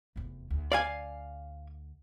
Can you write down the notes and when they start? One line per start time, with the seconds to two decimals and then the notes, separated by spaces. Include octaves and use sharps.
0.16 F1 E2
0.50 D2
0.72 D5 F5 G#5